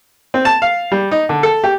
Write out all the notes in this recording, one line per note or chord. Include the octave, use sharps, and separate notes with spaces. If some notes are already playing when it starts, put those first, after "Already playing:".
C4
A5
F5
G3
D#4
D3
A4
G4